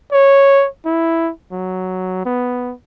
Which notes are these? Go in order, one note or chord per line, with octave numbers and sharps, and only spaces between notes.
C#5
E4
F#3
B3